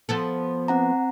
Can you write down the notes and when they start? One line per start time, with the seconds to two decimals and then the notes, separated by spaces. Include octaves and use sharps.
0.09 F3 B3 A4
0.68 C4 F#5 A#5